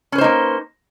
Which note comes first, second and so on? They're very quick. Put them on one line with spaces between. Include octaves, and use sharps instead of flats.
C#4 B4 C5 D#4 A#3